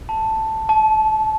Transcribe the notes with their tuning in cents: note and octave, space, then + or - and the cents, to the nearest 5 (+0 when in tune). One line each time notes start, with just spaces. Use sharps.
A5 +5
A5 -25